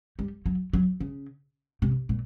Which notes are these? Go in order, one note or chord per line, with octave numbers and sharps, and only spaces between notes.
G3
F#3
F#3
C#3
C3
A#2